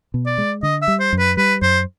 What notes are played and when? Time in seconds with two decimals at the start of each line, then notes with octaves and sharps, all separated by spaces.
0.14 B2
0.26 D5
0.38 G#3
0.63 D3 D#5
0.82 E5
0.88 G3
1.00 C5
1.13 F#2
1.19 B4
1.37 G3 B4
1.62 F#2 C5